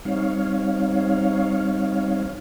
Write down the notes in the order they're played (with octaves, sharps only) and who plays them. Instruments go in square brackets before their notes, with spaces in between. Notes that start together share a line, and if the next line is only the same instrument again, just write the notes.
[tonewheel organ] G3 C4 D#4 C#5 F5